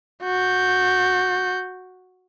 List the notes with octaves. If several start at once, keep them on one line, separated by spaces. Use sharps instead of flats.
F#4 G6